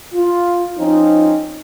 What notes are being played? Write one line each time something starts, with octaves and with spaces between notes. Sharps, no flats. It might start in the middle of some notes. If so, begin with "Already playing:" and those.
F4
F3 C4 C#4 D#4